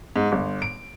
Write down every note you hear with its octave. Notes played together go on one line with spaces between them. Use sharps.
G#2
G1
D7